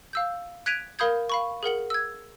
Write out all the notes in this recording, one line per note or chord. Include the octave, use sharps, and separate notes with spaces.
F5 E6 G6
F#6 G#6 B6 D7 D#7 F7
A#4 F5 B5 D#6 G6 G#6
F5 B5 C#6
G#4 A#4 F#5 F#7
E6 G#6